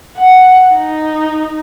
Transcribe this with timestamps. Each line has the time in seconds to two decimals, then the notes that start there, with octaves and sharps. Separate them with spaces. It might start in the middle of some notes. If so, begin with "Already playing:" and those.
0.17 F#5
0.74 D#4